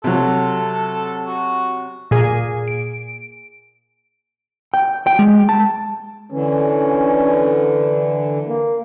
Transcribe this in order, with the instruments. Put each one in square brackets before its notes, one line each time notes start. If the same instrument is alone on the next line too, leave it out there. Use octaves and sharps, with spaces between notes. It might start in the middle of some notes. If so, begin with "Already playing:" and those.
[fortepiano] C3 F#3 [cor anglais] A4
[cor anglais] F#4
[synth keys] A#2 G#4
D7
[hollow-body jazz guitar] G5
G5
G#3
A5
[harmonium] D3 E3 [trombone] C#4
[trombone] A#3